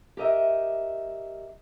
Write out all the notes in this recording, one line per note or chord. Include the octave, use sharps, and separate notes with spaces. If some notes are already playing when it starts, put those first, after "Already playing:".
G4 A#4 D#5 E5